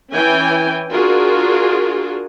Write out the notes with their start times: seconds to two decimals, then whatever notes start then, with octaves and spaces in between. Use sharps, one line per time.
0.12 E3 C#4 G5 G#5
0.91 D4 F4 F#4 G#4 A#4